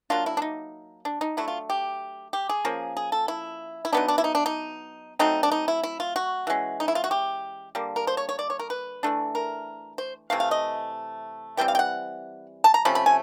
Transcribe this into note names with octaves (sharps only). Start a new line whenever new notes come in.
F#3 A#3 D4 F4
E4
D4
D#4
D4
D#4
F#3 A3 D4 E4
F4
G4
G4
G#4
F3 A#3 C#4
G#4
A4
E4
E4
F#3 B3 D4 D#4
D4
E4
D#4
D4
D#4
F#3 A3 C4 D#4
D4
D#4
E4
E4
F4
F#4
E3 G#3 C#4
D#4
E4
F4
F#4
G4
D3 G3 A#3
A#4
C5
C#5
C#5
D5
C#5
A#4
B4
E3 A3 D4
A#4
C5
C3 E3 A3 F5
F5
D#5
E3 G3 C4 G5
F5
G5
F#5
A5
A#5
C3 F3 A3 C#4 B5
B5
G#5